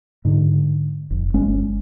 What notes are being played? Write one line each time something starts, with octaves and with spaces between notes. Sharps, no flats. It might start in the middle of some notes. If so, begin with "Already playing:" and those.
G#2 D3
F1
G1 G#3 C#4